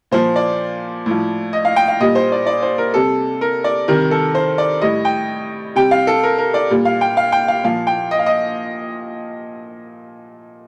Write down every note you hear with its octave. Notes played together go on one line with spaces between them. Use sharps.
A#2 F3 C5
D5
A2 F3
D#5
F5
G5
F5
A#2 G3 D#5
C5
D5
D5
C5
A#4
C3 G3 A4
A#4
D5
C3 D#3 G3 A#4
A4
C5
D5
A2 G3 D#5
G5
C3 G3 G5
F5
A4
A#4
A#4
D5
A#2 G3
F5
G5
F5
G5
F5
A#2 F3 F5
G5
D#5
F5
D#5